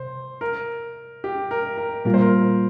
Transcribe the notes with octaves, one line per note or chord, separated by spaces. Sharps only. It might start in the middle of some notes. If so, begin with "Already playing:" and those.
Already playing: C3 C5
A#4
G4
A#4
A#4
A#2 G3 A#3 F4 A#4
C5
A#4